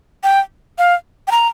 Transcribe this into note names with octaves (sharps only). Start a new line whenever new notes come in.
G5
F5
G5
A#5